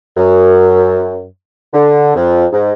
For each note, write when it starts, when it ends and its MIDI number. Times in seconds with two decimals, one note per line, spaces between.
0.17 1.25 42
1.74 2.12 50
2.15 2.45 41
2.53 2.72 44